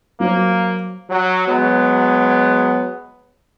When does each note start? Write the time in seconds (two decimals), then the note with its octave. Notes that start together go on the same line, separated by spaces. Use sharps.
0.20 F#3 A#3 C5
1.10 F#3
1.48 F#3 G#3 B3